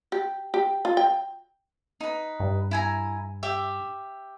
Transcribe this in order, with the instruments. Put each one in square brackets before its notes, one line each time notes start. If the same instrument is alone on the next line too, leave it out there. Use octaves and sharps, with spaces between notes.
[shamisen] G4
G4
F4
G5
[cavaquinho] D#4 B4
[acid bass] G2
[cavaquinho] E4 G#5 A#5
G4 E5